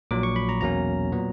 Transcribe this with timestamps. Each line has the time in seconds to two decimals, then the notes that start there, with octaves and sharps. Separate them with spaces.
0.11 A#1 A#2 F#3 D6
0.23 C#6
0.36 B5
0.49 A#5
0.61 E2 B2 F#3 A#3 C#4 A#5
1.12 A#2 F#3 B3